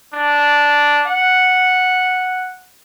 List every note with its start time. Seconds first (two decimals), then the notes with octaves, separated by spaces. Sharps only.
0.13 D4
1.07 F#5